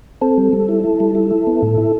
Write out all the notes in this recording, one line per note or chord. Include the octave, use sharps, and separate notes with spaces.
C4 A4
G3
G3
E4
E4
G3
E4
E4
B3
A2
E4